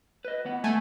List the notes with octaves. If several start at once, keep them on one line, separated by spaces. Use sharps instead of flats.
B4 D#5
D#3 B3 F#5
A3 G#5